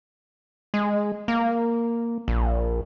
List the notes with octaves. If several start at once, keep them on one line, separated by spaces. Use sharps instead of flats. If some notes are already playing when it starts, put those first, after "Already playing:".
G#3
A#3
A#1